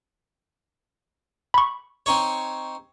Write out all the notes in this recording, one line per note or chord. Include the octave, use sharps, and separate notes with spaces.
B5 C#6
C4 D#4 C#5